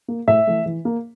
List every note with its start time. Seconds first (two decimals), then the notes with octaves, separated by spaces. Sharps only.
0.08 A#3
0.27 A2 E5
0.47 E3 A3
0.66 E3
0.85 A#3